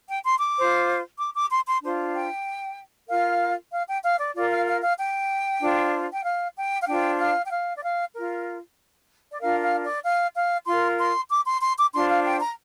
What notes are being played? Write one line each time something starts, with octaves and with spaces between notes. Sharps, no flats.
G5
C6
D6
F4 C5
D6
D6
C6
C6
D4 F4 C5
G5
F4 A#4 F5
F5
G5
F5
D5
F4 A#4 D5
F5
F5
F5
G5
D4 F4 C5
G5
F5
G5
F5
D4 F4 C5 G5
F5
G5
F5
D5
F5
F4 A#4
D5
D4 F4 A#4 F5
F5
D5
F5
F5
F4 A#4 C6
C6
D6
C6
C6
D6
D4 F4 C5 C6
F5
G5
A#5